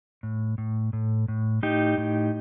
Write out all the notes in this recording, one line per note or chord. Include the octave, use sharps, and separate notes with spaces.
A2
A2
A2
A2
A2 D#4 G4
A2